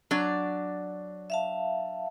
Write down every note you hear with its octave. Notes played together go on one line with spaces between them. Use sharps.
F#3 D4 D5
E5 F5 A5